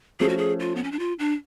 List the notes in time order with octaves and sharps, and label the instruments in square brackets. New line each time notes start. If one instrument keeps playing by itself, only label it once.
[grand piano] F3 A3 C#4 [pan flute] G#4
[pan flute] F#4
G#4
F4
B3
C#4
D4
F4
D4